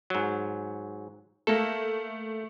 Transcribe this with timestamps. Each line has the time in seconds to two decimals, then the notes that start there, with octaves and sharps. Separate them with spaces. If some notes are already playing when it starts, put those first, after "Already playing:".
0.10 G#2 F#3
1.47 A3 A#3 A4